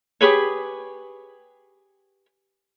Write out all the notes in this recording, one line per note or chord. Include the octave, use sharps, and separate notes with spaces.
G4 G#4 B4 C#5